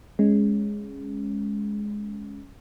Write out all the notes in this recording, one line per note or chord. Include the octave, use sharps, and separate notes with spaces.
G#3 C#4